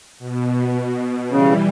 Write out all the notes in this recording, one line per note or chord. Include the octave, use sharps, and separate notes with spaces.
B2
C#3 E3 G3